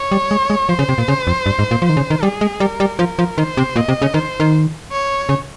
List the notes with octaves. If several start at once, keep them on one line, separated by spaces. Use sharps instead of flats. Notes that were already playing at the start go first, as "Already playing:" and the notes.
Already playing: C#5
G3
G#3
G#3
F3 C5
C#3
C3
A#2
C#3
F2
G2
G#2
A#2
F3
D#3 C5
C#3
D#3
G3 G#4
G#3
G3 A#4
G3
F3 A#4
F3
D#3 C5
C3
A#2 D#5
C3
C#3
D#3 C5
D#3
C#5
C#3